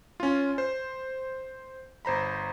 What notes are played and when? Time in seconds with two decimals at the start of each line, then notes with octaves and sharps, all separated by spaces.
0.20 C#4 F4
0.58 C5
2.05 G1 C5 A#5 B5